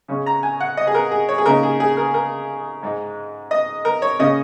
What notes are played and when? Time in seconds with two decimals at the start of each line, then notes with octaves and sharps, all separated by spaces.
0.08 C#3 G#3 C#4
0.26 A#5
0.43 G#5
0.60 F#5
0.77 D#5
0.87 G#4
0.94 A#4
1.11 G#4
1.29 C#5
1.38 G#4
1.46 C#3 A#3 D#4 A#4
1.63 G#4
1.80 G#4
1.97 A#4
2.14 A#4
2.83 G#2 G#3 D#4
3.51 D#5
3.85 A#4
4.02 C#5
4.19 C#3 A#3 C#4 D#5